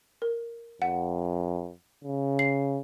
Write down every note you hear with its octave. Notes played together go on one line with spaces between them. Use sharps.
A#4
F2 F#5
C#3
C7